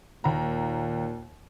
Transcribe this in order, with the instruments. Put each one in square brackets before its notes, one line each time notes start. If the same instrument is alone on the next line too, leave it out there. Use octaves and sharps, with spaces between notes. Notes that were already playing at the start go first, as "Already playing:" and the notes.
[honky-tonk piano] D#2 A#5 [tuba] A#2